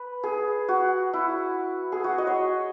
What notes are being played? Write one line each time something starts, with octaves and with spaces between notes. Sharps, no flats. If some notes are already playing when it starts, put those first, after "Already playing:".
Already playing: B4
G#4
F#4
E4
G#4
F#4
D#5
C#5